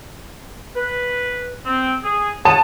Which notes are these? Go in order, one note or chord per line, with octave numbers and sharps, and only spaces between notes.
B4
C4
G#4
C#5 F#5 A5 D#6